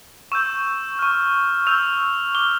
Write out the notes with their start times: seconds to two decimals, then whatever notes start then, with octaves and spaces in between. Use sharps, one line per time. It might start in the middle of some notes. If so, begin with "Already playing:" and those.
0.32 C#6 E6 G6 E7
0.99 C#6 F6
1.67 C#6 E6 G6 F7
2.35 D6 F6 G7